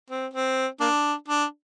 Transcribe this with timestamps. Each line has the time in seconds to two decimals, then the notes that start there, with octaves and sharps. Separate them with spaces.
0.10 C4
0.34 C4
0.81 A#3 D4
1.28 D4